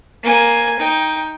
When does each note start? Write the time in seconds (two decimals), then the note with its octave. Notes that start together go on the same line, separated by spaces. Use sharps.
0.23 A#3 G#5
0.79 D#4 G5